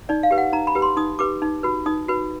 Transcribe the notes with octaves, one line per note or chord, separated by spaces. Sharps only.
D#4 D5
F5
G4 B4
F#5
D#4 A#5
B5
G4 B4
C6
D#4 D#6
G4 B4 D6
D#4
F#4 B4
D#4 D#6
F#4 B4